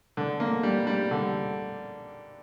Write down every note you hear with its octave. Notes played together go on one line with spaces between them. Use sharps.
D3
A#3
G3
G3
D3